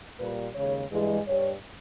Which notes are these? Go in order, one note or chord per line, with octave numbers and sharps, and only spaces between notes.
A#2 G3 B4
D#2 C#3 G#3 C#5
G2 E3 G#3
G2 G3 C#5